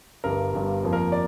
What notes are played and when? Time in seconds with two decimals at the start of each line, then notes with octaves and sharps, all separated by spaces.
0.24 G1 G2 G3 A#4
0.53 G1 G2 G3
0.83 F2 F3 A#3
0.93 A#4
1.12 D5